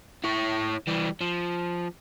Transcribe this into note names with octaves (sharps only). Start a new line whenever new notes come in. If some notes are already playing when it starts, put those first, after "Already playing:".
E4 C#5
E3 G3
F3